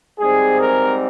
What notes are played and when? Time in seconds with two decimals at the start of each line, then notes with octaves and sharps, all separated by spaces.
0.19 G#2 G3 C4 G#4
0.61 A#4